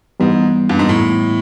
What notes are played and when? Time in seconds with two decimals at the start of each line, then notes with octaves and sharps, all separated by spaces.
0.20 G#2 E3 G3 B3
0.69 G2
0.79 G#2
0.89 A2